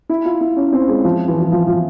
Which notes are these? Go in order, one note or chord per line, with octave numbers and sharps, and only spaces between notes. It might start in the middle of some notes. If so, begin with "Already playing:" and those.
E4
F4
E4
C#4
C4
G#3
F3
E3
E3
F3
F3